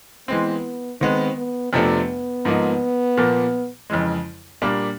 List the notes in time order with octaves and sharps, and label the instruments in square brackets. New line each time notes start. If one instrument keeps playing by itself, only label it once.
[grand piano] E3 G#3 C4 [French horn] B3
[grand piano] D#3 G#3 B3 [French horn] C4
[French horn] B3
[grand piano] F2 C3 F3 A3 D4 [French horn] B3
[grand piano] G#2 F3 A#3 D#4
A#2 F3 A#3
F2 C#3 E3 G#3
A#2 G3 A#3 D4